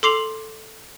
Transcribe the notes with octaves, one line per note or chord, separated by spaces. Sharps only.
A4 C6 D6 C7 F7 F#7